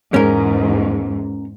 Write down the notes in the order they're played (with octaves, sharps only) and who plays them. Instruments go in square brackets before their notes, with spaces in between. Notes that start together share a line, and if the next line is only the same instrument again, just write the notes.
[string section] E2 G#2 [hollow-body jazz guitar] C#4 A#4